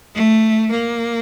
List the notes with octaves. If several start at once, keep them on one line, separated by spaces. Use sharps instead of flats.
A3
A#3